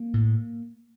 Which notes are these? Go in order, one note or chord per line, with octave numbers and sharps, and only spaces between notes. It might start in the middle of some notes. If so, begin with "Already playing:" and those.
Already playing: A#3
A2